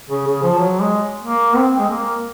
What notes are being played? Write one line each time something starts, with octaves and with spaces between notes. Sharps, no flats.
C#3
C#3
F3
F#3
G#3
A#3
C4
G#3
A#3